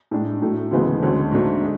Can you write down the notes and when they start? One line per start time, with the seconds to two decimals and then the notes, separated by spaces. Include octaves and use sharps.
0.11 A2 G#3 D4
0.42 A2 F#3 A3
0.71 D2 C#3 E3 G#3 B3
1.02 D2 D3 G#3 C#4
1.31 G#2 F#3 A3 D4
1.62 G#3